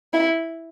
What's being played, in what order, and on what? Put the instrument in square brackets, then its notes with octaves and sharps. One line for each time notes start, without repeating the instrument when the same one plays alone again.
[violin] E4